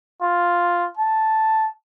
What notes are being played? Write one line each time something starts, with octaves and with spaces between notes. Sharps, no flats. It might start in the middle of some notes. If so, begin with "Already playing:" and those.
F4
A5